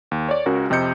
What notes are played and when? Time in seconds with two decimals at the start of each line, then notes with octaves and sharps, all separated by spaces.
0.11 D#2
0.29 C#5 D5
0.46 C#2 C#4 F#4 A#4
0.70 F2 C3 C5 D#5 G6 C#7